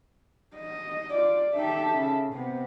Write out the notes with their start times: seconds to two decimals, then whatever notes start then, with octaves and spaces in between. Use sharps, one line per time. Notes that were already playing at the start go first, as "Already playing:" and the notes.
0.56 D#5
1.13 F4 D5
1.54 D#4 G4 A4 E5
1.94 C#3
2.33 C3 B3